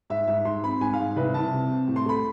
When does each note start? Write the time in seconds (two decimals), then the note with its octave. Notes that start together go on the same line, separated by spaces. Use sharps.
0.10 G#2 E5
0.27 G#2 E5
0.45 G#2 C6
0.64 C4 B5
0.81 G#2 G#5
0.93 F5
0.99 G#2
1.16 C2 B4
1.34 C2 A5
1.53 C3
1.70 C4
1.88 A2
1.96 C6
2.05 A3 B5